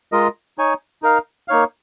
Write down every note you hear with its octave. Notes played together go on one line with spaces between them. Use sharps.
G#3 F4 A#4 D#5
D#4 C#5 G#5
D#4 A#4 F5
A#3 D#4 C#5 F5